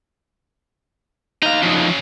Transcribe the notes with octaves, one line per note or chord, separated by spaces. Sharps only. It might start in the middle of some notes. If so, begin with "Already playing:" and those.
D#4 F5 A#5
C#3 F3 F#3 D#4